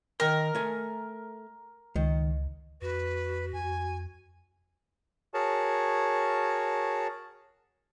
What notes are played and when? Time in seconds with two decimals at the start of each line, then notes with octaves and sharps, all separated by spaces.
0.20 D#3 A#4 G5
0.55 A3 G#5
1.96 C#2 D#3
2.82 F2 F#4 B4
3.53 F2 G#5
5.34 F#4 G#4 A#4 C#5 A5